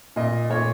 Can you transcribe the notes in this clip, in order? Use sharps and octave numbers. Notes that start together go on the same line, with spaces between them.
A#2 D#5
A#2 C#5